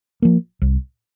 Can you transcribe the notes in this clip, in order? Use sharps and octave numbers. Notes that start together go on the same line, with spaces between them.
F3 A#3
C2